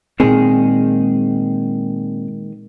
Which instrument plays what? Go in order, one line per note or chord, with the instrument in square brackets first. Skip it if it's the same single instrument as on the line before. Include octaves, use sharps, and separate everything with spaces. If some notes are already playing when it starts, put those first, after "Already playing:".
[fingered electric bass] A#2 C4 [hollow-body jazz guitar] D#3 G#3 G#4